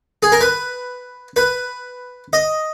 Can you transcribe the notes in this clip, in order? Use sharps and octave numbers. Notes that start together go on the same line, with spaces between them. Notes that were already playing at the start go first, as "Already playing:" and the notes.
G#4
A#4
B4
B4
D#5